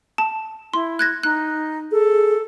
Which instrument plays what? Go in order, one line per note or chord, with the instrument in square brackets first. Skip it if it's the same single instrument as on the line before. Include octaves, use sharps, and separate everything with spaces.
[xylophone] A5
[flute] E4 [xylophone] C6
[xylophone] F#6 G#6 A#6
[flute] D#4 [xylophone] F#6
[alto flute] G#4 [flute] A4